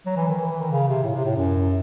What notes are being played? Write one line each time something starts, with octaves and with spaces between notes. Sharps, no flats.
F#3
E3
D#3
E3
E3
D#3
C#3
C3
A2
C3
A2
F#2